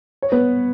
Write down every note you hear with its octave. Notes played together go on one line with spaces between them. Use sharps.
C#5
B3 B4